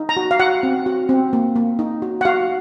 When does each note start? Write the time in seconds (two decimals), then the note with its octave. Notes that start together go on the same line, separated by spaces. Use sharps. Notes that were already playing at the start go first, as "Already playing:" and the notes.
Already playing: D#4
0.09 A#5
0.17 F#4
0.31 F5
0.40 F#4 F#5
0.63 C4
0.86 F#4
1.09 C4
1.33 A#3
1.56 A#3
1.79 D#4
2.02 F#4
2.21 F#5
2.25 F#4 F5